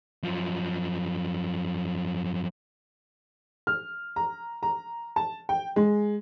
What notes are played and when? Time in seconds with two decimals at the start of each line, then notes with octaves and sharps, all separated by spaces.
0.23 F#2 F3
3.67 F6
4.16 A#5
4.63 A#5
5.16 A5
5.49 G5
5.76 G#3